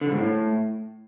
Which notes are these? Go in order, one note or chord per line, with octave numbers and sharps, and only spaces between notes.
D3
E2
G#2
A2